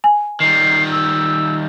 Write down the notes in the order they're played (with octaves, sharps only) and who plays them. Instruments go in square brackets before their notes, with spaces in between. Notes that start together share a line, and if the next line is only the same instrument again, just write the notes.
[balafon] G#5
[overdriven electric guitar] D#3 G3 [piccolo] C7
[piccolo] E6